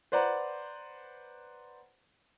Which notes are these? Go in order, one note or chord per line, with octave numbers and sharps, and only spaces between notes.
B4 C5 D5 F#5 A#5